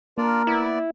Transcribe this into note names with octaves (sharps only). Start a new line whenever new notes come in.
A#3 D4 F4 A#4 D5
B3 E4 D5